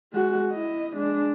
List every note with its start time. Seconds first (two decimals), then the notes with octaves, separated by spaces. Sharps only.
0.13 G#3 F#4
0.52 E4 D#5
0.97 G#3 D4